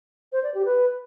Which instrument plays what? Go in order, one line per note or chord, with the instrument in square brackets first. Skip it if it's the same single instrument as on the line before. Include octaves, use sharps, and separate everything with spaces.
[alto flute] C5
D5
G4
B4